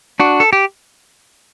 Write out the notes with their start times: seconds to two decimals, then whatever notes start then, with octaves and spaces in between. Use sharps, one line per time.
0.20 D4 F#4
0.40 A4
0.53 G4